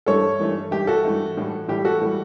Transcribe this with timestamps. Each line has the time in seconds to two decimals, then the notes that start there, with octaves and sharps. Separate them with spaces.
0.06 G2 E3 A3 A4 C#5
0.40 G2 E3 A3
0.71 G2 E3 A3 G4
0.87 F#4 A4
1.05 G2 E3 A3
1.37 A2 E3 G3
1.68 A2 E3 G3 G4
1.85 F#4 A4
2.01 A2 E3 G3